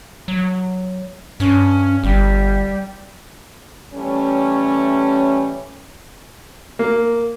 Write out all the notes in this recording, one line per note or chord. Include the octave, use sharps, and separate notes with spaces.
F#3
G2 C#4
G1 G3
E3 G3 A3 C#4
A#3